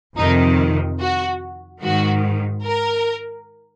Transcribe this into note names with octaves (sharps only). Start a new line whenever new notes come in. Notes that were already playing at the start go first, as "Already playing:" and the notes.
F2 C3 D#3 D#4
F#4
G#2 D#3 F#4
A#4